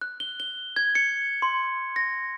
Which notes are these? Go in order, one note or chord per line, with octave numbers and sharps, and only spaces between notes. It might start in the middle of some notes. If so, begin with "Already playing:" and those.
F#6
G7
G7
G#6
C#7
C6
A#6